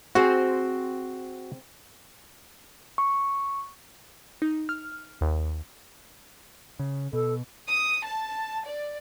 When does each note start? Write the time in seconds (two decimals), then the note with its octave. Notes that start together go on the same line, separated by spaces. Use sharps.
0.15 C4 F#4 G#4 C5
2.98 C#6
4.42 D#4
4.69 F6
5.21 D#2
6.79 C#3
7.13 B2 A4
7.68 D#6
8.04 A5
8.66 D5